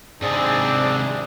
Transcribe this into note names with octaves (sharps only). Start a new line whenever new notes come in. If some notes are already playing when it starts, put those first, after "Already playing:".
G#2 C3 C4 D4 G#4 D5
G#4